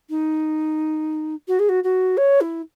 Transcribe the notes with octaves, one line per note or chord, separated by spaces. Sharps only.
D#4
F#4
G#4
F#4
F#4
C#5
E4